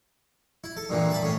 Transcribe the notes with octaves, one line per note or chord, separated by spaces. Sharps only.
E4
A4
G2 A#2 D3 E3
E5 A5 B5
A2 C#4